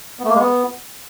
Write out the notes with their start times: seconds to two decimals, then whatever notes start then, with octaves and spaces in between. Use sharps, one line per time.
0.19 B3
0.24 A3
0.29 A#3
0.35 G#3
0.40 B3